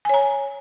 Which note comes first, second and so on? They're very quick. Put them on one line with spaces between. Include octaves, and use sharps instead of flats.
G#5 C#5 A#5